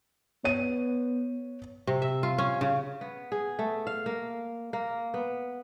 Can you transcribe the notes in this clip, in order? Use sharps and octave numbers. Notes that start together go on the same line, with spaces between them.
B3 C#5 D#7
C3
E5
F4
C#4
C#3
B3
G#4
A3
F5
A#3
A#3
B3